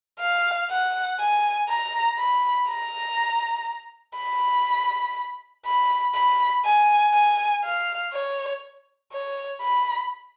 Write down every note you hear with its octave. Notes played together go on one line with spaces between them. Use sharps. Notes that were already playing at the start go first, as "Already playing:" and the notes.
F5
F#5
G#5
A#5
B5
A#5
B5
B5
B5
G#5
G#5
F5
C#5
C#5
B5